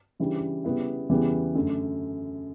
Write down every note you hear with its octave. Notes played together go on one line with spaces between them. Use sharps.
C#3 E3 G3 D4
C#3 G3 B3 E4
E2 C#3 E3 G3 B3
F#2 D3 A3